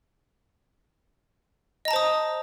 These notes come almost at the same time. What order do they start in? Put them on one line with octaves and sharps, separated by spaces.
D#5 A#5 A5 C5 D#6